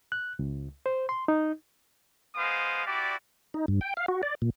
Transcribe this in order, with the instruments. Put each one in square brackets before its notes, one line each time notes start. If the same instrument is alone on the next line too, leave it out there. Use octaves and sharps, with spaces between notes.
[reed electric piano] F#6
C#2
C5
C6
D#4
[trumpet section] G#3 B3 C5 F5 D#6
E4 F#4 G4 D5
[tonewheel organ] D#4
G2
G5
F5
F#4
D5
A#2